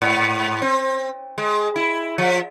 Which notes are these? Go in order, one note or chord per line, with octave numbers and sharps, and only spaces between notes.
G#2
C4
G#3
E4
F3